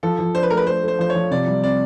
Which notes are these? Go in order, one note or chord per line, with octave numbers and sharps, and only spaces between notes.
F3 A4
F3
D4 C5
B4
A3 A#4
B4
A3 C5
A3 C5
F3 C5
C#5
F3
C3 D5
G3
C4 D5